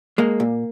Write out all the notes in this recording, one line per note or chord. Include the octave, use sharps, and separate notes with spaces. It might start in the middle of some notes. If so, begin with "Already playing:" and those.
G#3 A#3
A#2